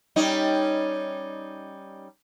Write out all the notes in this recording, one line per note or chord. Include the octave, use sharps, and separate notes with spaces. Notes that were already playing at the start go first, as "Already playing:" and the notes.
G3 C#4 D#4